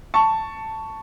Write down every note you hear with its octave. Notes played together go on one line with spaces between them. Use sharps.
A5 C#6